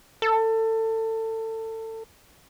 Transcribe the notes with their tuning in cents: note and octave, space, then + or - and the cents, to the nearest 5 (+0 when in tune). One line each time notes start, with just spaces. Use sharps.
A4 +25